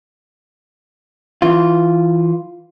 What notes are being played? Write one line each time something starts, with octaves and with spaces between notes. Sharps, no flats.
E3 F4